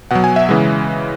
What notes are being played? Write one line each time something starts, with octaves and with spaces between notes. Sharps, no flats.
B2 F#3 F#5
G#5
E5
C#3 E3 G#3